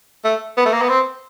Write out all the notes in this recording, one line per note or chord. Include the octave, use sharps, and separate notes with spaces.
A3
B3
A3
A#3
B3
C4